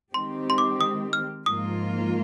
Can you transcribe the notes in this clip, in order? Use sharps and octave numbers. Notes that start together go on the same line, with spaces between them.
D#3 G#3 C4 G4 C6
C6
D6
D#6
F6
G#2 F3 A#3 F4 D#6